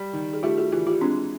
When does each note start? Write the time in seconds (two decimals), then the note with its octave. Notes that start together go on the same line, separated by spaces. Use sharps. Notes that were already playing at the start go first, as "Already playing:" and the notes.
Already playing: G3
0.13 D#3
0.33 G#4
0.43 A3 F4 G4
0.58 F#4 G#4
0.72 E3 F4 G4
0.87 F4 G4
1.01 G#3 C4 D4